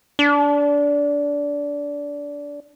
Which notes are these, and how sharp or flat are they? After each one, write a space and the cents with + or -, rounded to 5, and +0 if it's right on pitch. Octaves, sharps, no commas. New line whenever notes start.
D4 -20